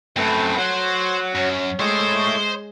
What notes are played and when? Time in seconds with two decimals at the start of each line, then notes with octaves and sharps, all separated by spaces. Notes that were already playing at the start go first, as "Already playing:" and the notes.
0.16 F#2 A3 C4 B4
0.59 F#3 C5 F#5 C6
1.35 F#2 C#4
1.80 G#3 A3 C5 C#5